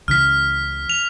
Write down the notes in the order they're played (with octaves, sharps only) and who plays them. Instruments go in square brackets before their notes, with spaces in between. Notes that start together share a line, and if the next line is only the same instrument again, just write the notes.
[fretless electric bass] C#2 C#3 E3 [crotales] F6 B6
[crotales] F7